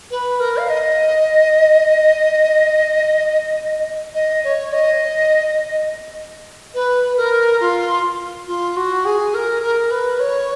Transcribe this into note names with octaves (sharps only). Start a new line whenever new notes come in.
B4
A#4
F5
D#5
D#5
C#5
D#5
B4
A#4
F4
F4
F#4
G#4
A#4
A#4
B4
C#5